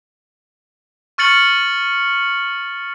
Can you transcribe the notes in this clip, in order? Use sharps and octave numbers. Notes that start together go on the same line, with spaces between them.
C#6 F6 A6 C#7 F#7